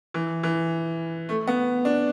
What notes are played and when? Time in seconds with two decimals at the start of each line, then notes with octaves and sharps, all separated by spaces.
0.14 E3
0.43 E3
1.29 A3
1.48 B3
1.85 D4